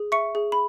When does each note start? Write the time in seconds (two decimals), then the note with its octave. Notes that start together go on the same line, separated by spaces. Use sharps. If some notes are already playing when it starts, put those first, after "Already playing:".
Already playing: G#4
0.12 E5 C#6 C#7
0.35 G#4
0.52 B5